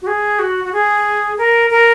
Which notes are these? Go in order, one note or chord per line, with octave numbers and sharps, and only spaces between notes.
F#4
G#4
F#4
F#4
G#4
A#4
A#4